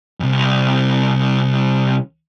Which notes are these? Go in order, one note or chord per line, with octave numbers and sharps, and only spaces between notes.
C2 F2